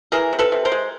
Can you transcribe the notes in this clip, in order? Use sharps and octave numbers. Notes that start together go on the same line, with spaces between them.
E3 G#4 A#4
C3
A4 B4
C3
A#4 C5
G#3